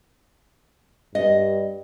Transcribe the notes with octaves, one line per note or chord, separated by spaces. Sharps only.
G2 D#5